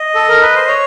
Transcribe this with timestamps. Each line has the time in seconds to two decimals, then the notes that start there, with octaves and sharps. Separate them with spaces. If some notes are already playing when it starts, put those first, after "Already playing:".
Already playing: D#5
0.15 A4
0.29 A#4
0.42 B4
0.55 C5
0.68 C#5